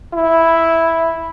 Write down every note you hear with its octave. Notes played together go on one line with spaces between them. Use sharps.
E4